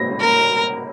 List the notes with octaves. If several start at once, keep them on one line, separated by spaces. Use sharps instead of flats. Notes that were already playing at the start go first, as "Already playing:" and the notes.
Already playing: A#6
A#4